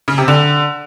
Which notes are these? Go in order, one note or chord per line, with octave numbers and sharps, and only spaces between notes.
C#3
C3
D3